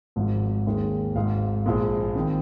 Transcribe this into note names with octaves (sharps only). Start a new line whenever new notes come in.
G#1 G#2 F3
D#2 D#3 G#3
G#1 G#2 G#3 F5
A#1 A#2 G#3
D#3 C4